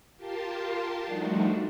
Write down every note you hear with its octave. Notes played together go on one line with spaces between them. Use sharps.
F4 G4 A#4 A5 C6
F3 G3 A3 D4 D#4 F#4